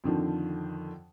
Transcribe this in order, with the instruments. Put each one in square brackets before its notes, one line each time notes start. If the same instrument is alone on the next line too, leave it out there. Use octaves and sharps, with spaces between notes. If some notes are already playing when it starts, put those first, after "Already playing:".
[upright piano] F2 D3 D#3 F3